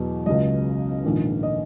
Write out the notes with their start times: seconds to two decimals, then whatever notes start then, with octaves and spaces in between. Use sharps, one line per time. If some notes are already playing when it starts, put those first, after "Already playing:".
Already playing: E2 B2 F#3
0.26 C#2 C#3 F#3 D#5
1.04 A#1 G#2 D#3
1.43 D#5